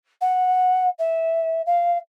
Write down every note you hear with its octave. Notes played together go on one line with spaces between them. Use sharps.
F#5
E5
F5